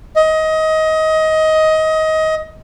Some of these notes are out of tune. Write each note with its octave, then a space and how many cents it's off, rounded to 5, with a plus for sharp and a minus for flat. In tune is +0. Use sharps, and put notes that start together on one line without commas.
D#5 +20